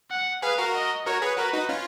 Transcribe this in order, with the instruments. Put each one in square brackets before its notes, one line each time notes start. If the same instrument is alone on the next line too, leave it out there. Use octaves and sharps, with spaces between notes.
[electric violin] F#5
[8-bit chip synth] G#4 B4 [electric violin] F5
[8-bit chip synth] F#4 A#4
[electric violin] D#5
[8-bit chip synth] F#4 A#4 [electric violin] C#5
[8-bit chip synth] G#4 B4
[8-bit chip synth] F#4 A#4 [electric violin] B4
[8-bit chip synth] D#4 F#4
C#4 F4